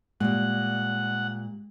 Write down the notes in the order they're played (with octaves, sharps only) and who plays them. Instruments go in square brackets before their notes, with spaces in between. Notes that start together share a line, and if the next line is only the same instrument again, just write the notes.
[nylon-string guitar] A#2 G3 [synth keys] G#3 [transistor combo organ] F#5